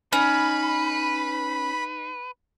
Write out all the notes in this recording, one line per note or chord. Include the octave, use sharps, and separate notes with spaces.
C#4 D#4 B4 B5